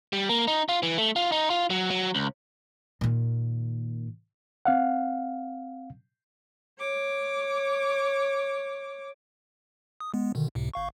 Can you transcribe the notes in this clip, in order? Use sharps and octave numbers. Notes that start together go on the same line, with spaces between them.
G3
A#3
D#4
F4
E3
A3
F4
D#4
F4
F#3
F#3
C#2
A#2 D#3
C4 F5 F#5
C#5 D6
D#6
G#3 B3
B2 D3 D#3
C#2 A2 C3
G1 F5 C#6